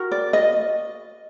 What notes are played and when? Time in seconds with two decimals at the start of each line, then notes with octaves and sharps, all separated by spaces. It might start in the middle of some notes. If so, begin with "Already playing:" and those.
Already playing: F#4 A#4
0.11 D5
0.33 D#5